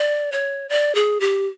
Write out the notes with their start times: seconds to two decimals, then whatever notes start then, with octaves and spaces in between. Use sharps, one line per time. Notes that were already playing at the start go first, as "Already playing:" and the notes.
Already playing: D5
0.32 C#5
0.69 D5
0.95 G#4
1.20 G4